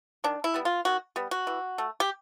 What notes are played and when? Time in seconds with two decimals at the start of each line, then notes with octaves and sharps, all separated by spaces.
0.24 D#3 D4
0.44 E4
0.54 G3 B3
0.65 F4
0.85 D#3 F#4
1.16 G3 B3
1.31 F#4
1.47 E3
1.78 A3
2.00 G4